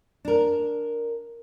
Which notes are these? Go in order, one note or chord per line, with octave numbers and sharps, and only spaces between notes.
D4 A#4